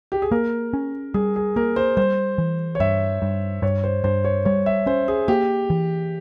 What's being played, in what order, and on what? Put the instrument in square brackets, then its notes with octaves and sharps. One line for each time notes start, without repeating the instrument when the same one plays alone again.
[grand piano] G4
G#4
[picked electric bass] A#3 [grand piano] A#4
[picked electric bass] C#4
[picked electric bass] G3 [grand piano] G#4
[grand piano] G#4
[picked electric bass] A#3 [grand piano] A#4
[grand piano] C5
[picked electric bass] G3 [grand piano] C5
[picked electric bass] E3
[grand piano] C#5
[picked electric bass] G2 [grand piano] E5
[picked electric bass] G2
[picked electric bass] G2 [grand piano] C#5
[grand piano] C5
[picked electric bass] G2 [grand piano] C5
[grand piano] C#5
[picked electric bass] G3 [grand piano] C#5
[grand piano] E5
[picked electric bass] C#4 [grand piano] C5
[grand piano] G#4
[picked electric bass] A#3 [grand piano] G4
[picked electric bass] E3